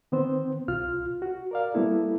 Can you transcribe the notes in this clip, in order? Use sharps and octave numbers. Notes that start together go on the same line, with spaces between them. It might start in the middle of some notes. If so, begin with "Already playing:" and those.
D#3 B3 C4 C5
C2 F4 F6
F#4
A#4 D5 F5
G3 A#3 B3 E4 A4